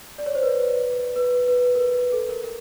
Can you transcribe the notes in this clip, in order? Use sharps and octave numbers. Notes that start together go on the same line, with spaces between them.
D5
C#5
C5
B4
B4
B4
A#4
B4
A4
A#4
A#4